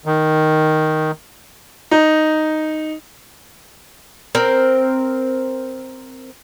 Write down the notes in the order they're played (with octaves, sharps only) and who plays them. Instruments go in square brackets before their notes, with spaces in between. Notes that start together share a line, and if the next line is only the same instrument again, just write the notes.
[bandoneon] D#3
[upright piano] D#4
[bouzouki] C4 A#4